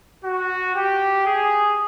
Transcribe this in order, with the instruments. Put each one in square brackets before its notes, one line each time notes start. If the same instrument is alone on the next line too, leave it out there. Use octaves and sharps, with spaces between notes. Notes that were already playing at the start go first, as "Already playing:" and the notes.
[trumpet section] F#4
G4
G#4